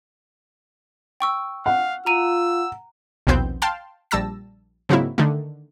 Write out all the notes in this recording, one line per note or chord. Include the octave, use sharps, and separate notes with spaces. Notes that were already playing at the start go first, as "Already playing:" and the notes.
G5 C#6 E6
F5 F#5
F4 A#5 E6 D#7
A#1 D#2 B2 B3 C4 G6
F5 G5 A5 C6 F6
A#1 G3 A5 E6 A#6
G#2 C#3 F#3 A#3 C4 E4
D3 D#3 A3